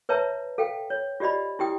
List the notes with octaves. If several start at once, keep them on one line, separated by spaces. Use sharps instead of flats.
B4 C#5 E5 A5 A#5
A4 F5 G5
C#5
F4 G4 D5 D#5 B5
E4 G4 G5 D#6